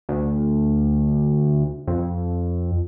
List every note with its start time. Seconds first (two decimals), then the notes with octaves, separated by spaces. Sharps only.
0.09 D2
1.87 F2